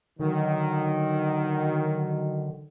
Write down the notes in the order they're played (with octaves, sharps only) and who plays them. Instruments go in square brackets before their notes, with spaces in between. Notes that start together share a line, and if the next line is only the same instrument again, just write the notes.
[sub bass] D3 [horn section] D#3 F#3